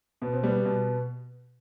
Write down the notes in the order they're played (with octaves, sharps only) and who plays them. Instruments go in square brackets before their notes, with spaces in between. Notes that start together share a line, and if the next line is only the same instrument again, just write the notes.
[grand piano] B2 B3
C4
G3 B3
B2